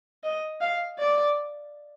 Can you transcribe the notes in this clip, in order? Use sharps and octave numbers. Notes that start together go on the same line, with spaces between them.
D#5
F5
D5